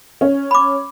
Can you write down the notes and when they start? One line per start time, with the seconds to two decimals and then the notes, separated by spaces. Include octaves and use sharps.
0.21 C#4
0.51 B5 D6